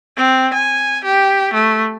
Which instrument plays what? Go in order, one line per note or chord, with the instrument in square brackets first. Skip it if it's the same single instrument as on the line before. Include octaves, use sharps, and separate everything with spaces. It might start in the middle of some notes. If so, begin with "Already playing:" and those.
[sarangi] C4
G#5
G4
A3